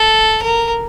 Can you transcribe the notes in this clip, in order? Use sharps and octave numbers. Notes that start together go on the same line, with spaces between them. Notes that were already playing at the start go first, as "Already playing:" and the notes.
Already playing: A4
A#4